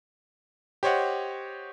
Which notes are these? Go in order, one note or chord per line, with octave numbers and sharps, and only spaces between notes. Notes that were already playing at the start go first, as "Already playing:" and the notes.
G4 C5 C#5 D#5 F#5